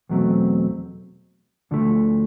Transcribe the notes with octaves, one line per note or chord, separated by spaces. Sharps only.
E2 B2 F#3 A3 C4
D2 D3 F3 A3